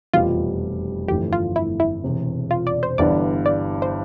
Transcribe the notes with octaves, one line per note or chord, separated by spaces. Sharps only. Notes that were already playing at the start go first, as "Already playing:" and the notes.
F1 E2 B2 G3 F4
G1 F2 E3 A3 G4
F4
E4
E4
E1 E2 C3
F4
D5
C5
G1 G2 E3 B3 D4 D5
D5
C5